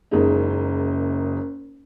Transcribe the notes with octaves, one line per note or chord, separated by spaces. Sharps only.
F#1 F#2 C#3 G#3 D#4